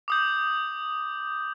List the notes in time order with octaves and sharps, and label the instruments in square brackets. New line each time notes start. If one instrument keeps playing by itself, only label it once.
[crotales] D6 D#6 G6